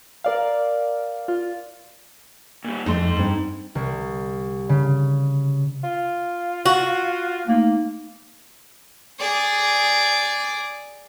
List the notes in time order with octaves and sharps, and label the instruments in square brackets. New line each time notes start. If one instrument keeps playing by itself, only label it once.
[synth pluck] A#4 D5 F5
F4
[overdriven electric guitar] A#2 G3
[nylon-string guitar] F2 A3 [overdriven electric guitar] D#4 C6
[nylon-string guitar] G2 C4
[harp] C2
C#3
[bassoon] F4
[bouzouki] F#4
[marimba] A3 D#4 [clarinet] A#3
[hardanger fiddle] G#4 D5